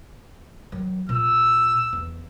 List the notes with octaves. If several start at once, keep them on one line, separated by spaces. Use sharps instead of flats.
D#3 F#3
A#2 E6
E2